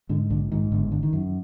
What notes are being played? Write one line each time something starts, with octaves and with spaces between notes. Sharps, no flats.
G#2 D3
A#1 D3
G#2 D#3
G1 D3
D3
D#3
F#2